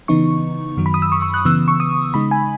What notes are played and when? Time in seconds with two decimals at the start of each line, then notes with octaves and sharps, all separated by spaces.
0.08 C#3 E3 B3 D#4 C#6
0.77 F#2 D#3 F#3
0.86 B5
0.94 D#6
1.02 E6
1.12 C#6
1.22 C#6
1.34 F#6
1.45 C#3 E3 B3 E6
1.68 C#6
1.80 D#6
2.14 C#3 G#3 D#4 B5
2.31 G#5